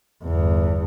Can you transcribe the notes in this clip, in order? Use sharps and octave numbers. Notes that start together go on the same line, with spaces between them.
G1 E2